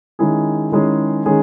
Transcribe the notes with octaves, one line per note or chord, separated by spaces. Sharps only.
D#3 G#3 C#4 E4 G#4
D#3 G#3 C#4 E4 G#4
D#3 G#3 C#4 G#4